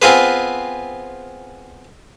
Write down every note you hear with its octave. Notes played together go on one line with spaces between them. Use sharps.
B3 C4 F4 G#4 B4